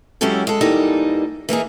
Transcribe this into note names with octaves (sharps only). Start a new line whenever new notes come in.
F#3 G#3 C#4 E4 G4 A4
G#3 A4
E2 E3 G3 A#3 D#4 A4
E3 A#3 D#4 G#4